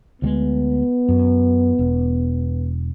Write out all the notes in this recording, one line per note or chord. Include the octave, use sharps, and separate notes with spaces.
D2 F#3 G#3 B3
F#2
E1